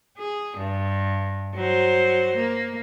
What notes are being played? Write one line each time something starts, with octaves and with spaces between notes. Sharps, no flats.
G#4
G2
F#3 C5
A#3